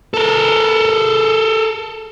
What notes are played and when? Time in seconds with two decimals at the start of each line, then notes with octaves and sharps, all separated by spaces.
0.14 A4 A#4